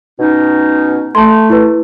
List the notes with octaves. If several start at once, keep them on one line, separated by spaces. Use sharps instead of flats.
B2 C#4 D#4
A3 A5 C6
E4 B4